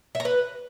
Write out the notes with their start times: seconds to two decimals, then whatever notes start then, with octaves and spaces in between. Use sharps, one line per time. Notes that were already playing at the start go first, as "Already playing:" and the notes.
0.15 E5
0.20 A#5
0.25 B4